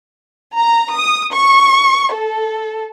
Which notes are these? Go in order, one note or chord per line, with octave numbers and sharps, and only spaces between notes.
A#5
D#6
C#6
A4